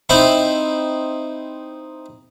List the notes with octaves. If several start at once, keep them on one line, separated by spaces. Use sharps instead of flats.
C4 D#4 E4